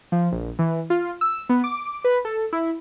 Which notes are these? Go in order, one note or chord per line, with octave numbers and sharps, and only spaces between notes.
F3
A#1
E3
F4
E6
B3
D6
B4
A4
E4